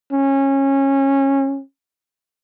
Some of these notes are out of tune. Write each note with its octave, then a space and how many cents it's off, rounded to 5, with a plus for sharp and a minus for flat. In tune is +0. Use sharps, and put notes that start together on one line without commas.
C#4 -20